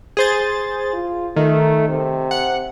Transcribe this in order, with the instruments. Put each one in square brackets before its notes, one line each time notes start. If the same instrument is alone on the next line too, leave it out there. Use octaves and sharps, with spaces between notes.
[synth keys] G#4 C5 A6
[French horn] F4
[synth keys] D#3 [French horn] A3
[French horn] C3
[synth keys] F#5